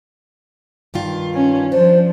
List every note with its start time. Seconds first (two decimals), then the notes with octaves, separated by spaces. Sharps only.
0.94 G2 D#3 F4
1.33 C#4
1.72 F3 D4 C5